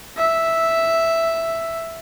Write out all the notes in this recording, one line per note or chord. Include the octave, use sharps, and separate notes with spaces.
E5